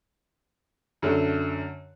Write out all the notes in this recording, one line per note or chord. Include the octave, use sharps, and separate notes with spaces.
F#2 D3 A3